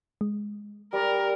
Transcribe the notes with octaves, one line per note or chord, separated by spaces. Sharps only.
G#3
G3 A#4 D5